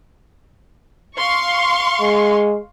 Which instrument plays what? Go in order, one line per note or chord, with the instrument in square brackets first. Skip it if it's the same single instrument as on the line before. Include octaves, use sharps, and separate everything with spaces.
[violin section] F5 C6 C#6
[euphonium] G#3